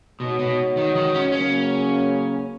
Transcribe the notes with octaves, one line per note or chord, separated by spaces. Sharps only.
B2 G#3 B3 D#4 F#4 C#5
B2
D#3
D#3
C#4
C#3 F#3 A#3 C#4